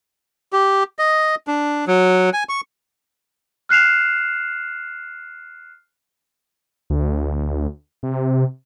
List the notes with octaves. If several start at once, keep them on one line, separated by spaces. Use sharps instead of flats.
G4
D#5
D4
F#3
G#5
C#6
F6 F#6 C7 E7 F7
D2
C3